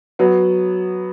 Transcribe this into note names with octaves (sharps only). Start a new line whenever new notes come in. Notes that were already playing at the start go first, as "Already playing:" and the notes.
F#3 B3